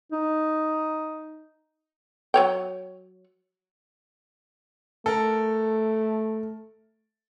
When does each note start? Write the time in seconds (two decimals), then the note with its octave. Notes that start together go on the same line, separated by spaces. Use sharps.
0.12 D#4
2.34 F#3 C#5 G5
5.06 A3 A4 A#4